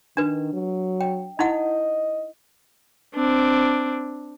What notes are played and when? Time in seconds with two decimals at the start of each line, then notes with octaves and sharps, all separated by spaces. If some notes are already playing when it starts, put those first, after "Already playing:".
0.17 D#3 D4 B4
0.54 F#3
1.01 G5
1.39 D#4 E4 D#5 F#5
3.15 C4 D4